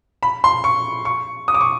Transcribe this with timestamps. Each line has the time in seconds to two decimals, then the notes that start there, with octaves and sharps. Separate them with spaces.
0.23 B5
0.44 C6
0.64 C#6
1.05 C#6
1.48 D#6
1.54 D6
1.61 C#6